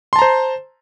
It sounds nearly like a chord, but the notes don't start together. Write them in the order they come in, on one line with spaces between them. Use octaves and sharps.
C6 A5 A#5 C5